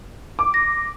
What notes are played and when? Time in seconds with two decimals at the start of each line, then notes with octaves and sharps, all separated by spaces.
0.39 D6
0.54 A#6